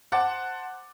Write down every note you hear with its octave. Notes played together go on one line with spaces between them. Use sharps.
C5 F#5 A5 D6 F#6 A6